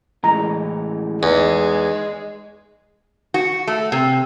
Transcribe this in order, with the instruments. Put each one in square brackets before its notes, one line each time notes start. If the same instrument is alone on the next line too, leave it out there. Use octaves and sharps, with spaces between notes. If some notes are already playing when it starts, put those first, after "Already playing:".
[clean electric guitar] A2 E3 G#3 [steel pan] A#5
[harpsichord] E2 [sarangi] G#3 [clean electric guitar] D#4
[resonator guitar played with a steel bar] F#4
A3
C3